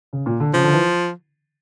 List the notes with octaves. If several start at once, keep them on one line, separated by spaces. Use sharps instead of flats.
C#3
A#2
D3
C#3 F3
D3
E3